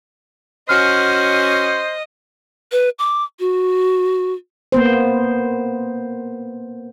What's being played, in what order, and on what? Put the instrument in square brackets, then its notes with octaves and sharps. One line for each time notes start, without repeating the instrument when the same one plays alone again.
[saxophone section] C#4 F#4 [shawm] C5 [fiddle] D#5 [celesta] F6
[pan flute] B4
D6
F#4
[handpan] A#3 B3 C5